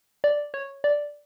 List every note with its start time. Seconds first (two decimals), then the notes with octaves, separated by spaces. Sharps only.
0.24 D5
0.54 C#5
0.84 D5